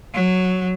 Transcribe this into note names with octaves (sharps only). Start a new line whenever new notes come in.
F#3